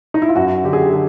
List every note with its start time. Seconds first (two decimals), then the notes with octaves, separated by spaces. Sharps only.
0.14 D#4
0.22 E4
0.29 F4
0.36 F#2 F#4
0.64 D3 G4
0.73 G#4
0.82 G4
0.93 D3 G#4